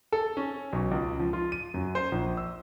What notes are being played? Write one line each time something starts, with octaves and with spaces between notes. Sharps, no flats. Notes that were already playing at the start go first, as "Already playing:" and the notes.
A4
C#4
B1
C#2
F3
F4
D#7
F#2
C5
A#1
E6